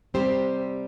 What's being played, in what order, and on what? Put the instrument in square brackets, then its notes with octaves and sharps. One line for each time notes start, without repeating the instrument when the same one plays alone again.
[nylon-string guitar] C3 G3 C4 G4 C5